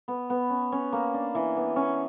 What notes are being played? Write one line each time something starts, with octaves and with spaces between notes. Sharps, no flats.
B3
B3
C#4
C#4
A#3
D4
E3
B3
C#4